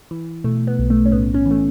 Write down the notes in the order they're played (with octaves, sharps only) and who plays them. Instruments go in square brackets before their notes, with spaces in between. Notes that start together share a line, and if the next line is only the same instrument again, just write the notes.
[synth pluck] E3
B2 A3
B3
B1
A3
C#4
A2 B3
C#4
E3
A3